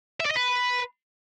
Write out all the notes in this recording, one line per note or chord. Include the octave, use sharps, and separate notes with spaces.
E5
D5
D#5
B4